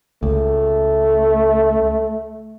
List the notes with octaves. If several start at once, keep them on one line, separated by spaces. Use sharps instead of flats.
C#2 A3